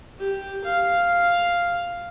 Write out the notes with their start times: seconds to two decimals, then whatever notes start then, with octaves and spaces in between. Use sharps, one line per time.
0.19 G4
0.64 F5